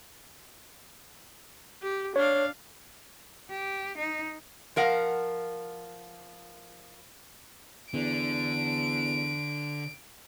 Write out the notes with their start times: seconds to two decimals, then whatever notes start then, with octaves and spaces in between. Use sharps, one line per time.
1.82 G4
2.16 D4 C#5 F5
3.51 G4
3.98 D#4
4.76 F3 A#4 F5 F#5
7.94 E2 D3 D7